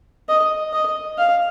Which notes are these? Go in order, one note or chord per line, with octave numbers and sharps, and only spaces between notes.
D#5
D#5
F5